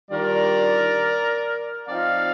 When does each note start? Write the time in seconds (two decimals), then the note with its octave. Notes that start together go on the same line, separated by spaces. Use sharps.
0.11 D#3 G3 D4 F4 A#4 D5
1.89 F3 C4 D#4 D5 F5